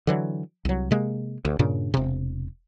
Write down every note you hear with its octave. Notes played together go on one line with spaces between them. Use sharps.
D3 E3 F#3
C2 F#3
C3 G#3 A#3
D2
G2 A#2 C#3 D4
E1 C3